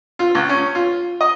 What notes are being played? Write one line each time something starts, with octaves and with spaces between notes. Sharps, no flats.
F4
C#2
C#4
F4
D#5